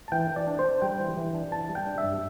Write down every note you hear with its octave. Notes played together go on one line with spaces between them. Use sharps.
A5
E3 G5
E3
D5
D4
C5
D4
G3 G5
E3
E3
D4
E3 A5
G3
G5
D4
E5
G2